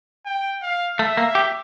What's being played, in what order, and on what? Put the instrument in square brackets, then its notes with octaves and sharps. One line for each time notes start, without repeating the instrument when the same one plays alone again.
[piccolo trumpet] G5
F5
[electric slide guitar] A3 [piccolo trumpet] E5
[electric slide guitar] A#3
G4